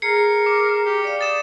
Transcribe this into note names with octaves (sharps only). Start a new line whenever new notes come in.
G#4 A#4 A#5 C7 C#7
D6
G4
D5 F5
D#6 A6 E7